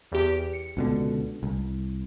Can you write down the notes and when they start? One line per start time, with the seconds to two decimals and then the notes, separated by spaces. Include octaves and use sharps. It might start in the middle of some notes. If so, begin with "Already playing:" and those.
0.12 E2 G4
0.53 C#7
0.77 C#2 B2 D3
1.43 C2